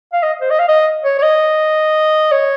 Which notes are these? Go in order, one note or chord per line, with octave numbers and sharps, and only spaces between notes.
F5
D#5
C5
D#5
F5
D#5
C#5
C#5
D#5
C#5